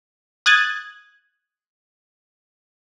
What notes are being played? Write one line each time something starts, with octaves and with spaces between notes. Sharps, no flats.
D#6 F#6 G#6 A6